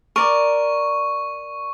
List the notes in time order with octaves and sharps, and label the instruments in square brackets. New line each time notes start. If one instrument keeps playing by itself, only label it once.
[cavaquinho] A#4 D5 [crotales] C#6